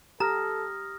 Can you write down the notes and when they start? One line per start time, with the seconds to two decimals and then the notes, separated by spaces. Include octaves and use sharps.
0.20 G4 A4 A#5 D#6 F6 A#6